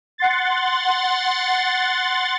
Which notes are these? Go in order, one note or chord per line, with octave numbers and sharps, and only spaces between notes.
F#5 C6 A6